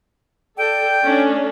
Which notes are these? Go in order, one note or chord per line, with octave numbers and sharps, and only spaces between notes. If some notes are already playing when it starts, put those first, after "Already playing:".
A4 D5 G5
A3 C#4 D4